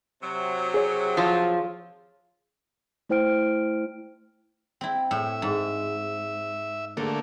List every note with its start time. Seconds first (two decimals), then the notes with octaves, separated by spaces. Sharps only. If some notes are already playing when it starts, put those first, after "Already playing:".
0.22 C3 F#3
0.74 G#4 C#5
1.17 F3 F4
3.09 A3 E4 C5 G5 F6 D7
4.81 C4 E4
5.11 A2 E5
5.42 G#2
6.97 D3 A3 A#3 A4